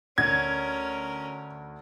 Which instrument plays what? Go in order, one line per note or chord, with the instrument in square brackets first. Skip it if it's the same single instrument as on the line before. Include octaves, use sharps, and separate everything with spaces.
[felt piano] D2 [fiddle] C#4 A#4 [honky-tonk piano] G#6